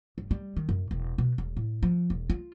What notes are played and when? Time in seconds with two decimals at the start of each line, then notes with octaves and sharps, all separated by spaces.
0.18 G1
0.31 G3
0.57 D#3
0.69 F#2
0.91 E1
1.18 B2
1.38 E1
1.57 A2
1.83 F3
2.10 E1
2.30 F4